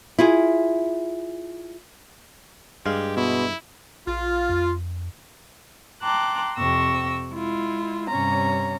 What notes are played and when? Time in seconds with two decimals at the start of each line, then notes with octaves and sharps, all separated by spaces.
0.19 E4 F4 G#4
2.86 G2 G#3 G4 F5
3.17 B2 E4
4.07 A#1 F4
4.50 F2
6.03 G5 A5 A#5 C6 D6 F#6
6.58 F2 C3 G5 C#6 E6 A#6
7.32 G#3 E4 F4
8.08 G2 C3 C#4 C#5 A#5